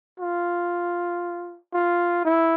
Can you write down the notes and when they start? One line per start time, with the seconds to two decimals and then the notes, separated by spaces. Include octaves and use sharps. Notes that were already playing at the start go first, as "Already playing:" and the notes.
0.20 F4
1.74 F4
2.25 E4